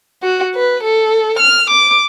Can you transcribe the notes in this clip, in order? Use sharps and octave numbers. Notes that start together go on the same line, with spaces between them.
F#4
B4
A4
F6
D6